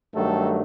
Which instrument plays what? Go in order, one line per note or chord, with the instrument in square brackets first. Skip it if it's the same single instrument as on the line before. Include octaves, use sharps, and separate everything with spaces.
[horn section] G2 D#3 F#3 A3 A4